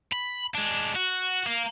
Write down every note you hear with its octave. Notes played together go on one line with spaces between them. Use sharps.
B5
G#3 D4
F#4
A#3